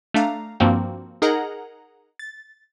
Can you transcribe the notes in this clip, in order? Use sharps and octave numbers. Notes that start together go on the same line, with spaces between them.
A3 D4 F5 A#5
G2 F3 A#3 C4 F#4
D#4 G#4 A#4 D#5 F#5 A#5
A6